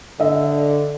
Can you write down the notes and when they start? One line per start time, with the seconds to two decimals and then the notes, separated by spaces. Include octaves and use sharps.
0.20 D3 D#5 E5